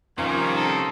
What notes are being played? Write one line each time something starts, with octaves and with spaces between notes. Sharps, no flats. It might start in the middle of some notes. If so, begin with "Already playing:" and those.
C3 D#3 F3 G3 A#3 C#4 A#4
D#4 A4